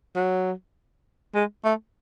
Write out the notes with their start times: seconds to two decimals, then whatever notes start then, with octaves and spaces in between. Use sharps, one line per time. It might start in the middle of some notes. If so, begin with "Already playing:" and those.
0.16 F#3
1.35 G#3
1.64 A3